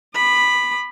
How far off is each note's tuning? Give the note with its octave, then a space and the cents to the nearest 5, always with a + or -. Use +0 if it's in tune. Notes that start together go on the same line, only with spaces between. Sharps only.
B5 +0 D6 +45